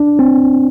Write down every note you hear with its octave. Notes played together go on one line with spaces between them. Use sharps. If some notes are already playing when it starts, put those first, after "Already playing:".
Already playing: D4
C4